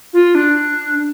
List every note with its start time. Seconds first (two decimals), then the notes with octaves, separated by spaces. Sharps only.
0.13 F4
0.35 D4